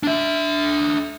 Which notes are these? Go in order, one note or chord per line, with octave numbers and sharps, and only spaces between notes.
D4 E5